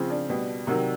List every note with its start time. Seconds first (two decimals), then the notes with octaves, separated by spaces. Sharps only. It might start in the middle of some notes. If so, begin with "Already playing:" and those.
Already playing: C#3 F3 C4
0.10 D4
0.30 B2 G3
0.67 C3 D#3 F#3